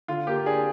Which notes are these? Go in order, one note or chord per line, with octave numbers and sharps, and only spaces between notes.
D3 F4
A#3 G4
D4 G#4